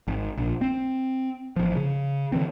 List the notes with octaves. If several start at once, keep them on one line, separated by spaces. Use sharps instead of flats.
G#1
A#1
C4
A1 F3
C#3
D3 E3 C4